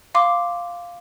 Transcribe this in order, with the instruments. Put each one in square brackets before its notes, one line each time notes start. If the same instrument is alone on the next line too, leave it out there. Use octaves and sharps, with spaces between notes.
[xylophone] F5 C6 D6